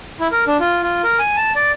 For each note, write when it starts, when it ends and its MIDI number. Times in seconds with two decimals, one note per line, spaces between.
0.20 0.27 64
0.32 0.44 70
0.47 0.57 62
0.60 0.83 65
0.83 1.02 65
1.04 1.18 70
1.19 1.36 80
1.37 1.52 81
1.56 1.71 74